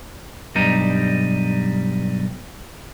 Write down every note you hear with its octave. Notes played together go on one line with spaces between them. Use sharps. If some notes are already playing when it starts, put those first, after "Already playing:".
B1 G2 G3 D#4